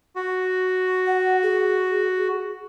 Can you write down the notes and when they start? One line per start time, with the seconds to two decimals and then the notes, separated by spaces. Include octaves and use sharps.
0.16 F#4
1.07 F#5
1.43 G#4